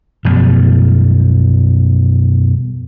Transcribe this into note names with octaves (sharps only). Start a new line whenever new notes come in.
F#2 B2 F3 G3